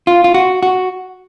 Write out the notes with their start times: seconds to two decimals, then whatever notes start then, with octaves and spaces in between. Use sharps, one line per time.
0.07 F4
0.24 F4
0.34 F#4
0.63 F#4